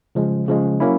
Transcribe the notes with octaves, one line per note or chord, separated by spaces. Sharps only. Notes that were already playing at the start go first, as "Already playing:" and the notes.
C#3 F3 G#3
C#3 F3 G#3
F#3 A#3 C#4 E4